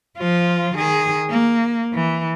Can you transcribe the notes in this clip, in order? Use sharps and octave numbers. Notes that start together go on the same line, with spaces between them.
F3 F4
D#3 G#4
A#3
E3